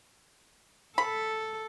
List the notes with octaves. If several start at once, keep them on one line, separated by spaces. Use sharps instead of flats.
A4 B5